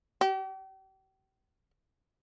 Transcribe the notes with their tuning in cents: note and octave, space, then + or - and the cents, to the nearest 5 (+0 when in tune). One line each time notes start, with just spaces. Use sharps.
G4 -40